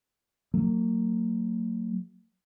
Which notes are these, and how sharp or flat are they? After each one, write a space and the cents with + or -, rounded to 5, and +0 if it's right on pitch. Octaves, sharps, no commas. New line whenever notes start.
F#3 +0 A#3 -40